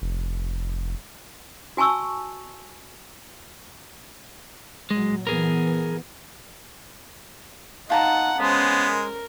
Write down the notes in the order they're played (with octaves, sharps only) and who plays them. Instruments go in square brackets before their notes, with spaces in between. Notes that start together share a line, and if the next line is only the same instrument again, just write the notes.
[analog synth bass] F1
[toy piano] F#4 G#5 A5 C#6 E6
[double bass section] A#2 F#3 [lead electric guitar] G#3
[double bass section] E3 B3 [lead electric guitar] G#4 A#4
[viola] D#4 F#5 [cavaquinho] F4 A5 A#5
[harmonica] G#3 [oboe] B3 [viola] C#4 C5
[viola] A#4